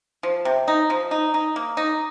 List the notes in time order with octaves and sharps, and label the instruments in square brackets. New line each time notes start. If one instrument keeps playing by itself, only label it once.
[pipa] F3
C3
D#4
F3
D#4
D#4
A#3
D#4